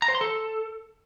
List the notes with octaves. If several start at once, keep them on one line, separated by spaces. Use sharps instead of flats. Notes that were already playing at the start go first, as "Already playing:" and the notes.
A#5
C5
C6
A4